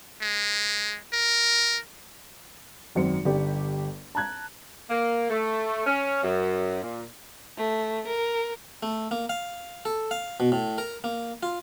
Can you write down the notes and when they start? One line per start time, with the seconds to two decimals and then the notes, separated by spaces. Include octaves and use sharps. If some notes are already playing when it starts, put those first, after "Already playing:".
0.21 G#3
1.13 A#4
2.95 G#1 F#2 C4 C#7
3.25 G1 G4 D5
4.15 A5 A#5 F#6 G#6
4.90 A#3
5.30 A3
5.87 C#4
6.23 F#2
6.83 A#2
7.57 A3
8.08 A#4
8.83 A3
9.11 A#3
9.29 F5
9.85 A4
10.11 F5
10.40 B2
10.52 A2
10.78 A#4
11.04 A#3
11.43 F4